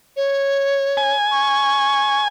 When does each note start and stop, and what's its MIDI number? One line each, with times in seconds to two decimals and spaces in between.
0.17 1.15 73
0.97 2.28 80
1.31 2.22 85